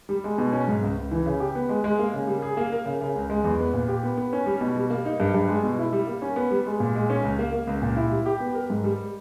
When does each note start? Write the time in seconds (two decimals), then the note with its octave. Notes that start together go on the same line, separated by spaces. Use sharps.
0.09 G3
0.24 G#3
0.38 B2
0.53 C#4
0.68 G#2
0.83 C#2
0.97 C#2
1.11 E3
1.26 C#3
1.40 G4
1.55 B3
1.69 G#3
1.84 G#3
1.99 A#3
2.14 C#3
2.27 G3
2.42 G#4
2.57 A#3
2.72 A#4
2.86 C#3
3.01 C#3
3.16 C#2
3.30 G#3
3.44 E2
3.60 B3
3.74 A#2
3.88 G4
4.03 B3
4.17 B3
4.33 C#4
4.46 G3
4.61 B2
4.76 G3
4.90 A#3
5.05 D#4
5.20 G2
5.34 G2
5.48 G#3
5.63 B2
5.79 E4
5.93 G3
6.07 A#3
6.22 C#4
6.36 B3
6.51 G3
6.66 G#3
6.80 A#2
6.95 G#3
7.10 C#4
7.23 C#2
7.39 A#3
7.53 A#3
7.67 C#2
7.82 A#2
7.96 E4
8.11 G3
8.26 G4
8.40 B3
8.55 A#4
8.70 G#2
8.84 G3